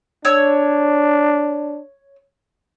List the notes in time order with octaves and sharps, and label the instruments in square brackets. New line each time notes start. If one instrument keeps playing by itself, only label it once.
[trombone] D4 [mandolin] C#5 E6